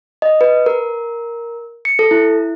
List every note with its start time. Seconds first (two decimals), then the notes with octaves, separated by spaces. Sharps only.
0.22 D#5
0.41 B4
0.66 A#4
1.85 C#7
1.99 A4
2.11 E4